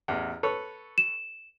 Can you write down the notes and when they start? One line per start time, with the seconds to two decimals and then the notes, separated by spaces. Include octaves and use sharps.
0.08 A1 E2
0.43 A4 B4 C#5
0.98 E7